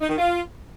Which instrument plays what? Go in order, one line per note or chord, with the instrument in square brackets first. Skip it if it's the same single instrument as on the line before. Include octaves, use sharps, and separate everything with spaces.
[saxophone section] D#4
D#3
F4